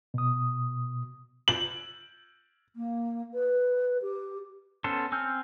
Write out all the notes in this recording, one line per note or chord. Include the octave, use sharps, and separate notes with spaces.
B2 D#6
F#7
A#3
B4
G4
B3 C#4 A4 C5
C4 G#5 E6 F6 G6